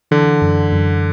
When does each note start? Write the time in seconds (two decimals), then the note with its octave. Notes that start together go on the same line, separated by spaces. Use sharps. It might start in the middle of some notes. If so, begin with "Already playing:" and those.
0.11 D3 E3
0.42 F#2
0.72 F#2